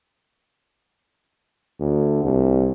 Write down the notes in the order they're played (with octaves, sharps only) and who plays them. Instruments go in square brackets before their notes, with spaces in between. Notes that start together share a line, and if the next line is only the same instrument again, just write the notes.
[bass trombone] D2
C2